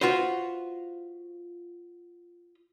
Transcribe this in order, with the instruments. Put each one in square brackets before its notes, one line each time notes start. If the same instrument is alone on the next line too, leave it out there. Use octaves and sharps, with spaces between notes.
[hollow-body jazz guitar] F4 F#4 B4 C5